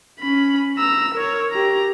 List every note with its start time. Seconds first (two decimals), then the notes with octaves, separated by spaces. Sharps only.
0.19 C#4 B5
0.78 A#5 E6
1.14 A#4 C#5
1.52 G4 A#5